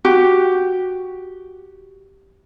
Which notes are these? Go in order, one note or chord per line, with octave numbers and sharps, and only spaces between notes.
F#4 G4